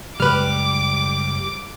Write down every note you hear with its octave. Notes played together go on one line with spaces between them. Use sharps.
F#2 C#3 G3 G#3 G4 B4 D6 F6